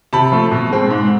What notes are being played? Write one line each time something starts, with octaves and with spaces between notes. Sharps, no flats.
C3 A5 B5
F3 A3
B2
G#3 C4
G#2